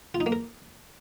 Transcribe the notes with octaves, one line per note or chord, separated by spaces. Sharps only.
F4
D#4
A#3
A#4